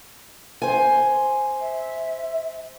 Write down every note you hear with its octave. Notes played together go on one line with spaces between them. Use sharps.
C5 G#5
E5